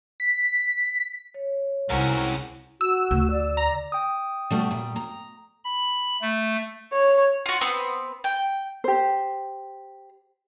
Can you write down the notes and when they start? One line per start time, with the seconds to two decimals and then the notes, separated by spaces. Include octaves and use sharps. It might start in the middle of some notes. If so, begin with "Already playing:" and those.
0.20 B6
1.34 C#5
1.90 C2 G#2 C4 C#4 E4 F#4 A#4 F#5
2.81 F#4 E6
3.11 D2
3.31 D5
3.57 A#5
3.92 G5 D#6
4.51 B2 G3 A3
4.71 A#2 G3
4.96 A#5
5.64 B5
6.21 A3
6.93 C#5
7.46 F4 F#4
7.61 B3 C4
8.24 G5
8.84 G4 C5